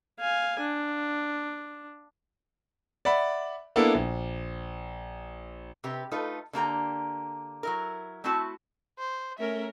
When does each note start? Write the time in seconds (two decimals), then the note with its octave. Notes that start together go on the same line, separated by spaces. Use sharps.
0.20 F5 G#5
0.60 D4
3.05 D5 E5 F#5 B5
3.76 A#3 B3 D4 E4 A4
3.94 A#1
5.84 C3 G4 B4
6.11 A3 D#4 F4 A4 B4
6.53 D3 A#3 G4 A#5
7.63 F#3 E4 A#4
8.24 A3 C4 E4 F#4 A5
8.99 C5
9.39 A3 C#4 A#4 E5